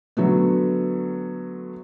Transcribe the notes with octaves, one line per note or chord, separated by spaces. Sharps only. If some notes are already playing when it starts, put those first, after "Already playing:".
D3 F#3 A3 B3